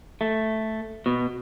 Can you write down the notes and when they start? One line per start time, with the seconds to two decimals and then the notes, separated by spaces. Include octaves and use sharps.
0.21 A3
1.06 B2